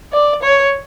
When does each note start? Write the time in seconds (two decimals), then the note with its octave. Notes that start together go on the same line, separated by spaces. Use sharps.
0.13 D5
0.43 C#5